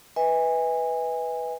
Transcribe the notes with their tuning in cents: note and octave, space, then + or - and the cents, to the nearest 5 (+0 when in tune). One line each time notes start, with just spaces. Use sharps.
B4 +0 E5 -45 G#5 -25